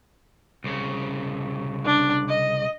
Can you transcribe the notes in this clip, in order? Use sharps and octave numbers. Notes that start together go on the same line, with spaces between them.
C2 C#3
D4
D#5